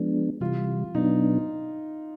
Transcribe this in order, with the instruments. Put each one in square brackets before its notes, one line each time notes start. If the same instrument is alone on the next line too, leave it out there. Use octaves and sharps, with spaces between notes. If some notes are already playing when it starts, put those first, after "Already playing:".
Already playing: [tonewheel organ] F3 G#3 B3 D4
[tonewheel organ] C3 E3 G3 [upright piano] F4
[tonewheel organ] B2 F#3 B3 D4 [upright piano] D#4